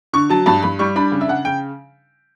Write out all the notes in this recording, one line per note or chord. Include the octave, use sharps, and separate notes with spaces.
D3 C#6
F#3 A5
G2 A5
G2 B5
G3 C#6
D4 B5
C#3
E5
C#3 F#5
C#3 G5